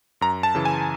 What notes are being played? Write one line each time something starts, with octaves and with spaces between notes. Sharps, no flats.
F#2 A#5
A5
C#3 E3
G#5